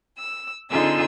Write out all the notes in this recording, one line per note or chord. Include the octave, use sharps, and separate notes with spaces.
E6
D3 C4 D#4 F4 G#4 E6